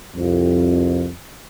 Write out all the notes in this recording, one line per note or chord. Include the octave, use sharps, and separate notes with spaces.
C2 F2